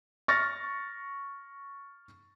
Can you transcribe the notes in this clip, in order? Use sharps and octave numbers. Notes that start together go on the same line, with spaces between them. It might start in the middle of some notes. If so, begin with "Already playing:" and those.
C#6 F6 A6 A#6